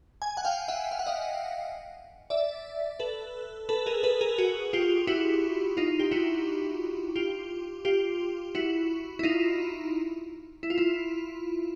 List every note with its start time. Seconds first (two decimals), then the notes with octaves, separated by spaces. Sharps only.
0.22 G#5
0.37 F#5 G#5
0.45 F5 G5
0.68 E5 F#5
0.91 F5
0.99 F#5
1.06 D#5 F5
2.30 D5 E5
2.99 A4 B4
3.69 A4 B4
3.86 G#4 A#4
4.03 A4 B4
4.21 G#4 A#4
4.38 F#4 G#4
4.73 F4 G4
5.07 E4 F#4
5.77 D#4 F4
6.00 G4
6.11 E4 F#4
7.16 F4 G4
7.85 F4 G4
8.55 E4 F#4
9.19 E4
9.23 D#4 F4
10.63 E4
10.70 F4
10.78 E4